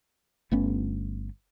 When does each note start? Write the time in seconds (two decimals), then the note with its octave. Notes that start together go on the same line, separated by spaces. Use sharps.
0.51 G1 A3 B3 C#4